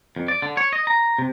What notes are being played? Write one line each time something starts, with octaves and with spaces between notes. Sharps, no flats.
F2
D5
D3
C#5
D#5
A#5
C3